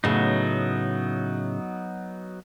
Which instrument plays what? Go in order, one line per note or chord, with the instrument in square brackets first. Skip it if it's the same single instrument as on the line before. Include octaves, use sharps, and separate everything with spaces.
[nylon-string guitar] A2 C#3 [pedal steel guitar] F#3 B3 D#4